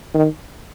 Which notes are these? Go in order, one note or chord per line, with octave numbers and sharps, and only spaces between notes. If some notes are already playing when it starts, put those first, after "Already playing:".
D#3